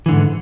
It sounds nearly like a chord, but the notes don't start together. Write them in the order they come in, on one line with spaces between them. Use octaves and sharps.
E3 D3 G#2